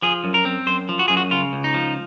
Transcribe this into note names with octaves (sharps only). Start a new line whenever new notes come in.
F3 G#4
F#2
A#4
C4
F#2 C5
F3
F#4
F#2 G#4
F#4
C#3 F4
C#2
D#4
F3